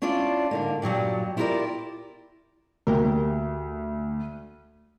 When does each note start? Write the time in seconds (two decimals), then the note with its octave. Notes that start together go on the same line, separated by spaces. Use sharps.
0.02 C#4 D4 E4 F4 D5
0.51 G#2 D3 A#3
0.82 G2 A#2 F#3 G3
1.37 E4 F4 G4 G#4 A#4 D5
2.87 D2 A#3 G4 A#4